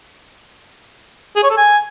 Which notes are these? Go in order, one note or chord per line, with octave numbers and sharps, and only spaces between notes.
G#4
C#5
A4
G#5